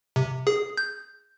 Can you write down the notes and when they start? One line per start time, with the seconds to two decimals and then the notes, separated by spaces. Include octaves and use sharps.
0.16 C3
0.47 G#4
0.77 G6